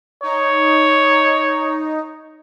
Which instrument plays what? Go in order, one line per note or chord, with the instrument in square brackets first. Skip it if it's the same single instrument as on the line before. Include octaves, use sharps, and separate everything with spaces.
[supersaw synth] D#4 [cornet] C#5